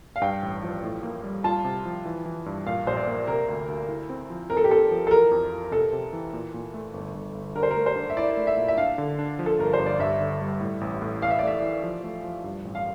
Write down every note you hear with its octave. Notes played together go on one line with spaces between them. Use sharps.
F5
G2 G5
A1
F3
A2
A#3
G3
F4 A5
C3
F3
E3
E3
G2
A#2 F5
A#1 C5
D5
A#3
C3 A#4
D2
D2
E4
C4
F3
C4 A#4
A4
G4
C4 A4
F3
A4
E3 A#4
F2
F4
C3 A4
C3
E3
A#2
A#2
A3
G1
G1
G1
D3 A#4
C5
A#4
A3
C5
D4
E5
E4 D5
A3
E5
A#2
E5
D4 F5
D3
D4
F3
A4
G1 A#4
C5
G1
D5
G2 E5
D3
G3
A2
A1
A2
E3 F5
E5
D5
A3 E5
E3
F3
A3
F3
G2
A1
F5